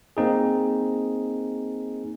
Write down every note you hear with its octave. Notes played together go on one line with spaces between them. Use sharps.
A#3 C4 D#4 G#4